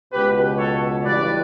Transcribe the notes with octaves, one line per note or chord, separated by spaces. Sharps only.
C#2 B2 G4 B4
A4 C#5
A1 G2 E3 B4 D5